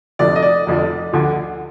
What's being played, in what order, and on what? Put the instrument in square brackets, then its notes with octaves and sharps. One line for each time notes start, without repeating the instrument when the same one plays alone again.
[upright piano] F1 F2 D3 F3 D5
D#5
D5
F1 F2 D3 F3
D2 D3 F3